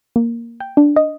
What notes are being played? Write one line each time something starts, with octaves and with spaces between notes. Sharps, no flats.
A#3
G5
D4
D#5